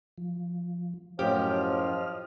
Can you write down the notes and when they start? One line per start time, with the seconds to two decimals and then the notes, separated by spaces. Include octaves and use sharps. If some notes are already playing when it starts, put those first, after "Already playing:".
0.18 F3
1.19 F#2 A2 F3 F#3 G4 D#5 F6